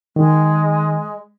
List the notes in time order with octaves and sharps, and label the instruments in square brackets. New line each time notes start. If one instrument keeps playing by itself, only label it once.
[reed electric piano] D#3 [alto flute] G#3